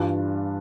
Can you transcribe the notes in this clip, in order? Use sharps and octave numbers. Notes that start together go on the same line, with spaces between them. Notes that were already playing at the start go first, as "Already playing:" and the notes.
Already playing: G2 E3 G3 D4 F4